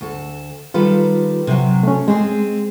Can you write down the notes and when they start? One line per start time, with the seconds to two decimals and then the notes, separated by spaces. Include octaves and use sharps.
0.01 D2 A4
0.74 D#3 G3 F4 A4 B4
1.47 C3 E3 F#3
1.83 A3 C#4
2.08 G#3 C4 G#4